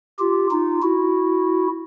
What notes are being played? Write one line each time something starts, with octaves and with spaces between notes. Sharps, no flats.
F4 G4
D#4 F4
E4 F#4